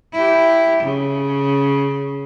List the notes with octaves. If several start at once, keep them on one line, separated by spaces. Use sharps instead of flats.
E4 G4
C#3